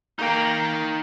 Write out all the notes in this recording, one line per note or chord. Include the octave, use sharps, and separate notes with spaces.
A#3 D#4 G5